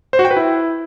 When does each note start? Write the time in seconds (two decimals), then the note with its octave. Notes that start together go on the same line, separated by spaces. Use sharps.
0.13 C5
0.19 F#4
0.25 G5
0.31 B4
0.37 E4